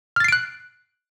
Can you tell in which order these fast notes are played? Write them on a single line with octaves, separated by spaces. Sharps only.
F6 A6 C7 D7 F#6